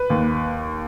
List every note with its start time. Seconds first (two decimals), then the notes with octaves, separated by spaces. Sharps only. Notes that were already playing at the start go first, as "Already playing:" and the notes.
Already playing: B4
0.10 D#2